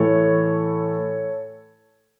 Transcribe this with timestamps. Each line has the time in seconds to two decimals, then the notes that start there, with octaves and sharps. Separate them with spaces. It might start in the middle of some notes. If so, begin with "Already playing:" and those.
Already playing: A2 E3 A4 C#5